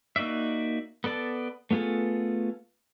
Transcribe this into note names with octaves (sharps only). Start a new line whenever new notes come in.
A#3 D#4 F#4 D5 E5
B3 A4 D5 A5
A3 B3 F4 G#4 A4